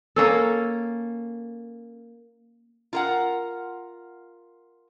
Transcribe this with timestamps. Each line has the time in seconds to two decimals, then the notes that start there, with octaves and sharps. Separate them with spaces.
0.16 A#3 C#4 A4
2.93 F4 A#4 F#5